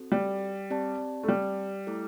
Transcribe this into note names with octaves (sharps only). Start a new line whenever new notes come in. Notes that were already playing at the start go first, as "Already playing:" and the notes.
Already playing: C4 F#4 A4
G3
C4 G4 D5 A5
A3
G3
A3 E4 A4